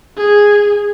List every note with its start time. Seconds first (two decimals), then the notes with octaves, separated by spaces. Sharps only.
0.17 G#4